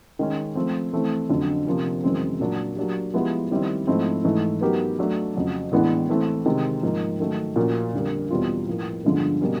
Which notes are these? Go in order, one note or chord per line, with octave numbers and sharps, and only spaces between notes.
D#3 G#3 C#4
F3 A3 C4
E3 A3 C4
F2 D3 F#3
C3 F3 A#3 C#4
F#2 C#3 E3 G#3 C4
A#2 F#3 A#3 D4
F#3 A#3 D4 G4
F3 G#3 B3 E4 G4
D#3 G3 C4 E4
G#2 F3 A3 C4 E4
G#2 E3 A3
F#3 B3 D#4 G4 A#4
F#3 A3 D4
F2 C#3 F#3
A2 E3 G#3 B3 D4
E3 A3 C4
C3 D#3 G#3 C4
G#2 F3 A#3 D#4
D#3 F#3 A3
A#2 F3 A#3 C#4 F#4
F2 D3 G3 A#3
E2 B2 G3 C4 F4
A2 F3 A#3
G2 D3 F3 G#3 B3
B2 G3 A#3 C#4